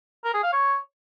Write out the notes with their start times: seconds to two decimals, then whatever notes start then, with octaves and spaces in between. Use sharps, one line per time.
0.24 A#4
0.34 G#4
0.43 F5
0.53 C#5